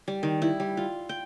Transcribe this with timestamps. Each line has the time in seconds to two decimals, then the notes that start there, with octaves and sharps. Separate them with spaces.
0.08 G3
0.23 D#3
0.42 E4
0.60 G3
0.77 F4
1.09 G5